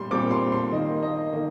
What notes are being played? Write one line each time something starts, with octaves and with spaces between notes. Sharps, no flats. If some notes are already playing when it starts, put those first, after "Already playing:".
Already playing: A#2 G3 C6
A#2 G3 C4 D6
C6
C6
D#3 A#3 D#5
D#5
D#3 A#3 D#5